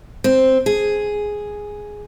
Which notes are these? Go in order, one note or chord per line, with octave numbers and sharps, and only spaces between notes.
C4
G#4